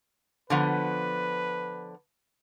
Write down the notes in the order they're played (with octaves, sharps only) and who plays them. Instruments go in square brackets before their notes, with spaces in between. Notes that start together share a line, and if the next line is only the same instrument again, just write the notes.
[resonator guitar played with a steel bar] D3 F3 B3 [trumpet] B4